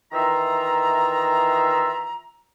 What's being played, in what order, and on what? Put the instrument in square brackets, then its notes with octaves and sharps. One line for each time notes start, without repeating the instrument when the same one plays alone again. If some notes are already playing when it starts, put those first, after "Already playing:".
[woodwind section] D#3 E3 F4 E5 A#5